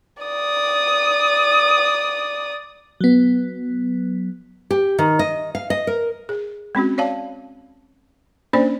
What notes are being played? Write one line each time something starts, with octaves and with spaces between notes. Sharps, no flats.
D5 D#6
F#3 B3
G4
D#3
D#5
F5
D#5
A#4
G#4
G#3 C4 C#4 F#4
C#5 D5 F5 A5
A#3 C#4 D4 C5 D5